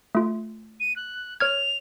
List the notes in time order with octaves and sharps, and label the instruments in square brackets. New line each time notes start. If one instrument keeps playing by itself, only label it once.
[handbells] A3 F4
[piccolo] D#7
F#6
[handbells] C#5 F6 G#6 [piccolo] F7